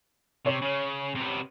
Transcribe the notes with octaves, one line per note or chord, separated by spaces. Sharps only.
C3 C#5
C#3
C3 B3